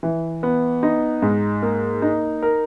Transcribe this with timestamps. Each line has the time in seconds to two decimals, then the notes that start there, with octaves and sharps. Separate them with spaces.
0.03 E3
0.43 B3
0.83 D#4
1.22 G#2
1.62 A#3
2.02 D#4
2.43 A#4